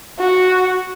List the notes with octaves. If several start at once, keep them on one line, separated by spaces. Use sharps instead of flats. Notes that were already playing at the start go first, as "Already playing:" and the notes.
F#4